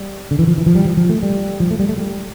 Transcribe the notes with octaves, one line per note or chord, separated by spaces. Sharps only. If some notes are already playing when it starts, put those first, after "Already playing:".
Already playing: G3
D3
E3
F3
E3
F3
G3
F3
F3
A3
G3
F3
A3
G3
A3
G3